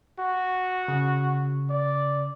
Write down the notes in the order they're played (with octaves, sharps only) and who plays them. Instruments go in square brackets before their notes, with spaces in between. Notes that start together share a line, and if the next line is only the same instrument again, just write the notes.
[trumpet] F#4
[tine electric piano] C#3
[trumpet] D5